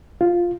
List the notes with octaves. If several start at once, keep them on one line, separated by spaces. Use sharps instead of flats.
F4